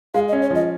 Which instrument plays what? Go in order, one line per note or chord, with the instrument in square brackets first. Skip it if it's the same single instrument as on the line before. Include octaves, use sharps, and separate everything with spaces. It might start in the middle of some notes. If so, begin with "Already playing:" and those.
[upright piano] G#3 [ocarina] F5
[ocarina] D#5
[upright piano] C#4
[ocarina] C#5
[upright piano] F3 [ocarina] D#5